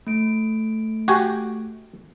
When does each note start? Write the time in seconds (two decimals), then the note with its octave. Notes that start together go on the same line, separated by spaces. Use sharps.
0.07 A3 D7
1.08 F#4 G4 G#5